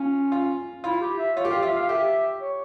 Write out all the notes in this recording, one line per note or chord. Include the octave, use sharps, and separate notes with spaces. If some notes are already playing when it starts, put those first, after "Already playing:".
Already playing: C#4 F4
F4
E4 F4
G4
E5
F4 C#5
G4
F4 F5
F4 E5
F5
G4 E5
C#5